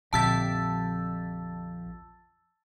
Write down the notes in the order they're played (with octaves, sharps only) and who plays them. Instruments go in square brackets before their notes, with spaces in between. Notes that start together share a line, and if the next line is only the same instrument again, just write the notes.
[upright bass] A#1 D3 [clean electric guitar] F2 G4 E5 [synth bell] A5 E6 A6